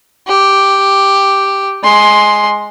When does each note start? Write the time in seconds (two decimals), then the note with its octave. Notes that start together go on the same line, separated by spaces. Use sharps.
0.28 G4
1.84 G#3 C6